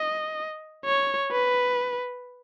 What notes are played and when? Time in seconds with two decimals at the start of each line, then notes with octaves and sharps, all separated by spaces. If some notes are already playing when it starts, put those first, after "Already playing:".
Already playing: D#5
0.86 C#5
1.32 B4